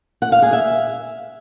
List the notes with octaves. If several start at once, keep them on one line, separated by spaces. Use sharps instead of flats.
F#5
F5
G#4
E5